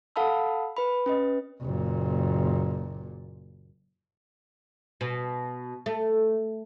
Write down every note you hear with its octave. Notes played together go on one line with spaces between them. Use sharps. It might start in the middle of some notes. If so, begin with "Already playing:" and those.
A4 F5 F#5 A5 B5 E6
B4 B5
C#4 B4 D#5
F#1 A#2
B2
A3